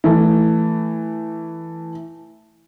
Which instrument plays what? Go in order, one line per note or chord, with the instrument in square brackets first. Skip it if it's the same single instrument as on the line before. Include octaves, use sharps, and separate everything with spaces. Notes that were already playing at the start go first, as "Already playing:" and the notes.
[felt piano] E3 A3